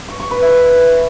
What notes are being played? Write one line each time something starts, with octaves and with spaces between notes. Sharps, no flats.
C#6
C#6
B4
E5